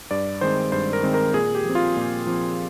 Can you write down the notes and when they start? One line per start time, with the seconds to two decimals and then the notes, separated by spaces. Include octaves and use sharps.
0.11 G2 D5
0.41 D#3 G#3 C4 C5
0.72 G2 C5
0.93 A#4
1.03 D#3 G#3 C4
1.14 A#4
1.34 A#2 G#4
1.55 G4
1.65 F3 C4
1.75 F4
1.96 A#2
2.27 F3 C4